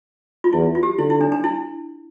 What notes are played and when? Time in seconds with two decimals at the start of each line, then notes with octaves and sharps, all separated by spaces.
0.44 F4
0.53 E2 E4
0.75 F4
0.83 G4
0.98 D3 E4
1.10 E4
1.21 D4
1.32 D4
1.44 E4